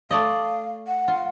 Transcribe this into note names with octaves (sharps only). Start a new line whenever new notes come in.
A3 D5 D#5 F5
F#5
F4